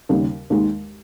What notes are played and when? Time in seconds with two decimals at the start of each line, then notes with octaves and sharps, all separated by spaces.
0.09 D#2 C#3 G3
0.50 D#2 D#3 G#3